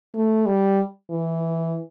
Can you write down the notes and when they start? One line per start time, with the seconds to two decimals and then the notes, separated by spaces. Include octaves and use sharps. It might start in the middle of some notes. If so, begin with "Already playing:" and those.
0.15 A3
0.46 G3
1.10 E3